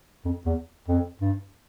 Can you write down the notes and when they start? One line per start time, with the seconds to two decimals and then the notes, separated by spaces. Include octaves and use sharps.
0.25 F2
0.46 E2
0.88 F2
1.21 G2